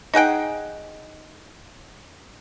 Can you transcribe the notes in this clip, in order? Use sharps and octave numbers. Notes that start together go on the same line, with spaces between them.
D#4 G#4 F#5 G5